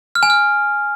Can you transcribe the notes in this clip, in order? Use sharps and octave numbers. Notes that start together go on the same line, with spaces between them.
F6
G#5
F6